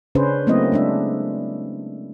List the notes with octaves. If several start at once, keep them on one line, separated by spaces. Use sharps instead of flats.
C#3 C#4 D4 G#4 B4 C5
F#3 A3 A#3 C4 E4 D#5
G#3 D4 E5